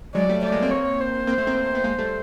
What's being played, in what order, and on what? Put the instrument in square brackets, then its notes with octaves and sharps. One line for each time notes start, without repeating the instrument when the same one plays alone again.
[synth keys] F#3 G#3 [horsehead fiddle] D5
[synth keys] G3 A3
[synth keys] G3 A3 [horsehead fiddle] D5
[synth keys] G#3 A#3
A#3 C4
[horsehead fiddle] C#5
C5
[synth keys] A#3 C4
A3 B3
A#3 C4
B3
G#3 A#3
G3 A3